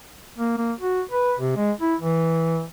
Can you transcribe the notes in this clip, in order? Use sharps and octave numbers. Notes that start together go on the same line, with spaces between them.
A#3
A#3
F#4
B4
C3
G#3
E4
E3